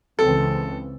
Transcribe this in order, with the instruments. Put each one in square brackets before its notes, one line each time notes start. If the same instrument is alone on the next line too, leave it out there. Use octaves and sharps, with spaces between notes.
[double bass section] C#2 C#3 E3 C4 [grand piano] A4